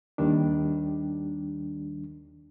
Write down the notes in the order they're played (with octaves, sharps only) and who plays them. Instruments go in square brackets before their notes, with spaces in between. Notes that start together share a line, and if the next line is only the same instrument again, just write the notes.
[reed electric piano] D#2 D#3 G3 D4